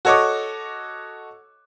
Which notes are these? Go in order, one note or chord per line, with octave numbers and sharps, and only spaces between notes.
F#4 A4 C#5 D#5 C#6 D6